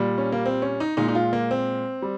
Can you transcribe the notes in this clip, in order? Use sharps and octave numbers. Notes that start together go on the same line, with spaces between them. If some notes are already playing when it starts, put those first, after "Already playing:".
Already playing: A#2 G3
C#4
A#3
C4
C#4
D#4
A#2 G#3 D#4
D#4
F4
A#3
C4
G3